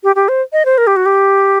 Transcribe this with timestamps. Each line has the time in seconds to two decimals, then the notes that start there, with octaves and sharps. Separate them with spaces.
0.04 G4
0.16 G4
0.29 C5
0.53 D#5
0.65 C5
0.78 A#4
0.87 G4
0.96 F#4
1.06 G4